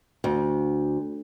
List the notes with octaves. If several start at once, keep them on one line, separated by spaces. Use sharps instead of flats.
D2